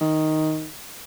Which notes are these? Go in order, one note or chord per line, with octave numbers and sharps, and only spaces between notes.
D#3